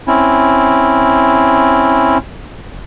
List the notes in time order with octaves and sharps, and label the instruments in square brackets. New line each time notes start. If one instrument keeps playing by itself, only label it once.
[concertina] C4 C#4 E4